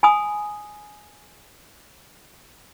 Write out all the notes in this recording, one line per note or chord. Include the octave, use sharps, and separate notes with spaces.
G#5 B5 D#6